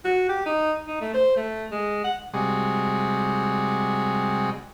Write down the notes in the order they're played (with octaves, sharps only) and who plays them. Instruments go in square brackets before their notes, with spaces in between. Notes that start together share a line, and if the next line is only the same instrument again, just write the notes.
[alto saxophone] F#4
G4
D#4
D#4
A3
C5
A3
G#3
F#5
[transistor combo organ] C3 G3 G#3 F#4 G#4